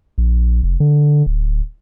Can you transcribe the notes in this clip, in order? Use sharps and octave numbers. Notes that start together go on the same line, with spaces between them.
A#1
F1
D3
D1